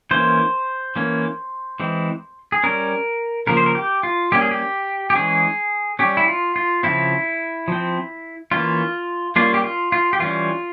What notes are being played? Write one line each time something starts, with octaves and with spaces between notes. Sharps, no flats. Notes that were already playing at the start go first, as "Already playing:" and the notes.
E3 A#3 C#4 C5
E3 A#3 C#4
E3 G#3 C4
G#4
G3 C#4 A#4
C#3 F3 A#3 A#4
C5
A#4
G4
F4
G3 A#3 C#4 G4
G#4
G4
G4
E3 G#3 C#4 G#4
G3 C#4 G4
E4
F4
F4
C#3 F3 C4 E4
F3 C4
E3 A#3 C#4 F4
G3 A#3 C#4 F4
G4
F4
F4
G4
E3 G3 C#4 F4